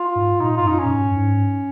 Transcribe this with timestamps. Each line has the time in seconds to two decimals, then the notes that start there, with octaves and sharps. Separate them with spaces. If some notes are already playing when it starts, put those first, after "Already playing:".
Already playing: F4
0.15 G#2
0.40 A#2 D#4
0.57 G#2 F4
0.65 F#2 D#4
0.79 C#4
0.85 A#2
0.91 G#2
1.11 F#2
1.16 G#2